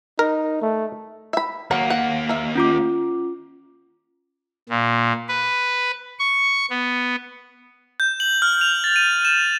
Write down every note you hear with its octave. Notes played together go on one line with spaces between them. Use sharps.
D#4 A#4
A3
E5 B5
D#2 F#3 A#3 A#4 F#5
F#5
A#4 E5
C#4 F4 D6
A#2
B4
C#6
B3
G6
F#7
F6
F7
A6
D#7
E7